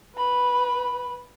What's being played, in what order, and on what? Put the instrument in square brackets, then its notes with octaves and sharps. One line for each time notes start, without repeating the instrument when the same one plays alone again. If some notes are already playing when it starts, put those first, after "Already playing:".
[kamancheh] B4 B5